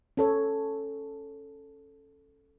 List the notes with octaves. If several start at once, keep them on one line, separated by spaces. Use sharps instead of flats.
C#4 A4 C#5